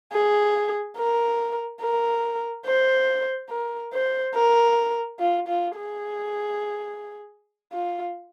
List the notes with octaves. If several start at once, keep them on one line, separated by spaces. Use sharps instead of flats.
G#4
A#4
A#4
C5
A#4
C5
A#4
F4
F4
G#4
F4